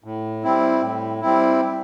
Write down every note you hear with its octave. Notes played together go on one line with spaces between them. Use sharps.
A2
G3 C4 E4
A2
G3 C4 E4